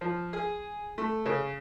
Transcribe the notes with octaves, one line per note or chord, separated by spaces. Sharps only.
F3
G#4
A3
C#3